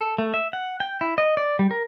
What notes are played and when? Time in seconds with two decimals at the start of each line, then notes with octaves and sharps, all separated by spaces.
0.01 A4
0.18 A3
0.34 E5
0.53 F#5
0.80 G5
1.01 E4
1.18 D#5
1.37 D5
1.59 G3
1.71 A#4